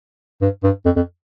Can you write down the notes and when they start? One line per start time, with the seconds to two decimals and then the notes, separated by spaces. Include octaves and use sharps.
0.41 G2
0.63 G2
0.85 F2
0.96 F2